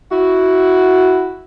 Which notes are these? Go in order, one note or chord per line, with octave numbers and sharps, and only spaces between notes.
E4 F#4